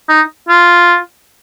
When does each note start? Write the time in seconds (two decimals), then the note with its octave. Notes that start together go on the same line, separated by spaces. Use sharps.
0.09 D#4
0.49 F4